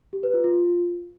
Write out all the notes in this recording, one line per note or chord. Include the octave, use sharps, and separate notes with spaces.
G4
B4
F4
F4